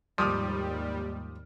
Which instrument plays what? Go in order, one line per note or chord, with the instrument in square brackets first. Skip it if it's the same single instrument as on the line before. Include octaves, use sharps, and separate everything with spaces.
[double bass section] D#2 G#2 [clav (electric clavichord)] F3 [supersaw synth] G3 [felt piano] D6 D#6 F6